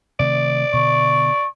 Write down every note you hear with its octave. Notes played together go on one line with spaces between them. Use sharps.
C3 D#3 A3 D5
B2 D3 C#6